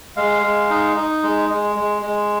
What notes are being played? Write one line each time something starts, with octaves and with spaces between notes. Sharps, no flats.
G#3 F5
G#3
D#4
D#4
G#3
G#3
G#3
G#3